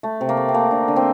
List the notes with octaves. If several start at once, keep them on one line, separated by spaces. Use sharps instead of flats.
A3
C3
A#3
A3
C4
A3 A#3
D3
D3
C4